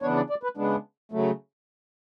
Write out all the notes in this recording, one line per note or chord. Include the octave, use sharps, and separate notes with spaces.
C#3 E3 B3 D4 C#5
D5
D5
B4
C#3 G#3 B3 D4
C#3 F#3 A3